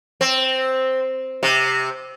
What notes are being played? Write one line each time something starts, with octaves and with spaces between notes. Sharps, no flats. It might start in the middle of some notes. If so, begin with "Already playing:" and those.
C4
C3